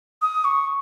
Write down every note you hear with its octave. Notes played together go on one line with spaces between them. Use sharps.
D#6
C#6